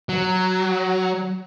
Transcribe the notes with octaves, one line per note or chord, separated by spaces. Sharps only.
F#3